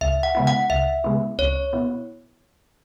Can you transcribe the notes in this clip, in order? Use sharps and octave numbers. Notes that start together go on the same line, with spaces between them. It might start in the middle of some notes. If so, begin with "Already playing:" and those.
C#2 E5
F#5
C#3 G#3 B3 E4
F#5
C#2 E5
C#3 G#3 B3 E4
C#2 C#5
B2 B3 E4